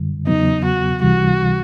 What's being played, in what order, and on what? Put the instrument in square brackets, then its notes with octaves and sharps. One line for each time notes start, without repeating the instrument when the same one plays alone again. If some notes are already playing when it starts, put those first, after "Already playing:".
Already playing: [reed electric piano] F#2 D3 G3
[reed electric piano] E2 C#3 F#3 B3 [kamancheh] D#4
[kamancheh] F#4
[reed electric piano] C#2 C3 E3 G3 [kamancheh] F#4